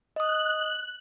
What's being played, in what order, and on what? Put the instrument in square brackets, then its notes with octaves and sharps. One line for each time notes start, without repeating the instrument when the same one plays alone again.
[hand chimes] D#5 D#6 [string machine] F#6